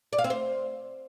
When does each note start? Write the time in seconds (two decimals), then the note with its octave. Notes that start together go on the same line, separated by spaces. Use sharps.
0.13 D5
0.18 F5
0.24 C4
0.30 C5